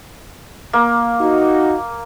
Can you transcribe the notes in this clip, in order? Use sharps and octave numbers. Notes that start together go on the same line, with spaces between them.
A#3
D#4 F#4